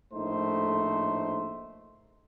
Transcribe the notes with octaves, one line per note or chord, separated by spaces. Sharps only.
A#1 A2 A3 D#4 C5